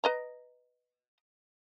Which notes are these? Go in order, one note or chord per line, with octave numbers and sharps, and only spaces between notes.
B4 D#5 A#5